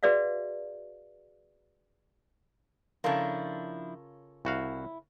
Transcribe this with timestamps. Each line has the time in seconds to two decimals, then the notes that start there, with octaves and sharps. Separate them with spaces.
0.03 F#4 G#4 B4 D5 E5 F5
3.04 C#3 F3 D4 E4 F4 A4 A#4 C#5
4.45 C2 E4 F#4 F5